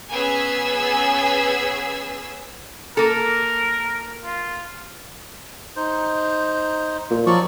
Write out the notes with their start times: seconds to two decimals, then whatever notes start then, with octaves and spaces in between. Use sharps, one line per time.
0.10 B3 C#4 G#4 G#5 E6
2.97 A#3 A4 A#4
4.24 F4
5.76 D#4 C5
7.10 A#2
7.26 F3 F#3 D5 C#6